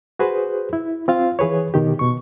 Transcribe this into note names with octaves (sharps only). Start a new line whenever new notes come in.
F#4 G#4 B4 C5
E4
C4 F4 F5
E3 G#4 B4 C#5
B2 D#3 G4
B2 C#6